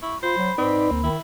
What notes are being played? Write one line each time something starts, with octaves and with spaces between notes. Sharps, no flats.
E4 C#6
F4 C5 B5
F#3
G#2 C4 D#4 B4 D5
D2 A#3
D#3 E4